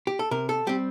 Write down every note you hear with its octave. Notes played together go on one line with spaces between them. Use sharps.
G4
A4
C3 A#4
A4
G3 C4 G4